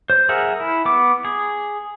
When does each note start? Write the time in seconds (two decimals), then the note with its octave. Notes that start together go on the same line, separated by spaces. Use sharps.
0.10 C5
0.29 G#4 A#4 E5 F#5 G#5
0.60 E4
0.85 B3 D6
1.25 G#4